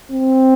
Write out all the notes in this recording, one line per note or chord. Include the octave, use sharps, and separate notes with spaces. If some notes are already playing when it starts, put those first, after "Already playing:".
C4